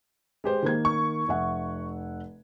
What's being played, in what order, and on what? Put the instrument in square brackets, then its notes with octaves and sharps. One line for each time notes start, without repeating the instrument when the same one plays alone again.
[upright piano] G#3 G4 C5
[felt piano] D#3 A#3 G#6
[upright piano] C#6
[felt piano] F1 E5 F#5